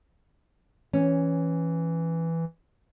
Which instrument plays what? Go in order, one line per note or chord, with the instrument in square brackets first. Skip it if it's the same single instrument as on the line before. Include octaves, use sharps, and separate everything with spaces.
[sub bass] E3 [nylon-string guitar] C#4